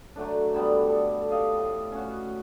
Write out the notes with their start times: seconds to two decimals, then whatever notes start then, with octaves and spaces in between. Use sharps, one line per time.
0.16 D3 F#3 A3 D4
0.54 D3 G3 B3
0.89 A4
1.31 G4 A4 D#5 F5
1.57 A2
1.92 C#4 F#4